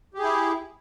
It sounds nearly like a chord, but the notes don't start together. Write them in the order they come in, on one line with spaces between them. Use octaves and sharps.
G4 G#4 E4